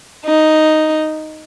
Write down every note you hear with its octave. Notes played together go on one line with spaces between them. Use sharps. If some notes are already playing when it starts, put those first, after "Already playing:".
D#4